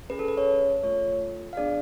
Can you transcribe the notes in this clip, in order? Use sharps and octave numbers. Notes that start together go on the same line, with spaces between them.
C#4 G#4 B4
A4
B4
C#5
A3 F4 A4 C#5
F5
B3 D4 G#4 D5